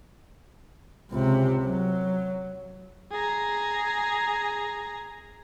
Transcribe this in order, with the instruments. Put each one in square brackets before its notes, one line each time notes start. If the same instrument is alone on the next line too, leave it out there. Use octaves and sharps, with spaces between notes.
[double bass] C#2 C3
F#3
[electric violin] G#4 A#5